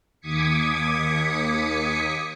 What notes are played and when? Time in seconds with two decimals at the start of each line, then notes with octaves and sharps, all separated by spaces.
0.21 D#2 D6 D#6 G#6 B6 C#7